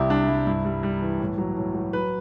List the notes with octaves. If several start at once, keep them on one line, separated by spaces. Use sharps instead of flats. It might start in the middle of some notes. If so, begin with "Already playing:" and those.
Already playing: C2 C3 G3 E4 G4
C2 D4
C2 E4
G2 E4
G3
G3
E3
A2
F#3
A2
F#3
F#3 B4